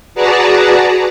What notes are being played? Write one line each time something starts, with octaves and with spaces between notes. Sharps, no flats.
F#4 G#4 B4 D5 A5 A#5